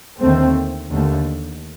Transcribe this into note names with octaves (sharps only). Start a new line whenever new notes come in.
D#2 D3 A3 C4
D#2 D3 A3